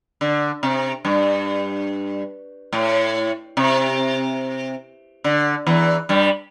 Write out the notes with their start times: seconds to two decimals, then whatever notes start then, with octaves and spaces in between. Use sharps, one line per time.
0.21 D3
0.63 C3
1.05 G2
2.73 A2
3.57 C3
5.24 D3
5.67 E2 E3
6.09 G2 G3